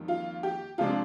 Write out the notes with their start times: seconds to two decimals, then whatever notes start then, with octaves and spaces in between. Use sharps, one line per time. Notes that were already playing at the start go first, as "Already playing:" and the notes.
Already playing: F2 D#3 G3 A#3
0.08 F4
0.43 G4
0.78 C3 F3 G#3 D4 F4